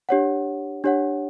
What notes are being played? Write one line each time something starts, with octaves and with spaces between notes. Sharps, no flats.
D4 G4 C#5 F#5
D4 G4 C#5 F#5